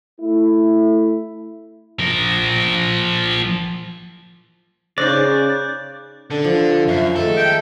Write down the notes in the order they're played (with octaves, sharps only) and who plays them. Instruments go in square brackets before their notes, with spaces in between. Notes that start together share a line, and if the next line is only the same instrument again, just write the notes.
[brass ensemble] A3 E4
[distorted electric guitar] F3 A#4
[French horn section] C#3 [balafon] D#4 C5 [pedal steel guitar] D5 [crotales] F#6 G6
[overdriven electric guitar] D3 [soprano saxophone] D4
[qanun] F3
[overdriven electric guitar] F#2 [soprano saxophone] E5
[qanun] D#3 G#3 A3 [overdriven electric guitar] A4
[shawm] G5